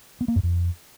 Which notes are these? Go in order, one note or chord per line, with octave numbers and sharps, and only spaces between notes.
B3
A#3
F#2
F2